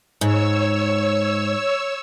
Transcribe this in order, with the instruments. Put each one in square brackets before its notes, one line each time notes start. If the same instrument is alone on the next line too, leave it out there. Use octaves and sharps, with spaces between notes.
[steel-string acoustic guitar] G#2 [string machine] C#5 E6